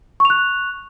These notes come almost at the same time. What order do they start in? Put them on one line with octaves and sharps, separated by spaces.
C#6 F7 F#6